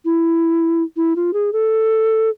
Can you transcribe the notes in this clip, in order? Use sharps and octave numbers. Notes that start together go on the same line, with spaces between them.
E4
E4
F4
G#4
A4